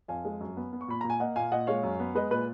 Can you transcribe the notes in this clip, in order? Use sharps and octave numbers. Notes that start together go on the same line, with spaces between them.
F2 F5 G#5
G#3
F#2
B3
B3
C#6
A#2 B5
A#2 A#5
G#5
A#3 D#5 F#5
A#2 F5 G#5
A#2 D#5 F#5
G#3 C#5 F5
F#2
B3
G#3 B4 D#5
A#2 B4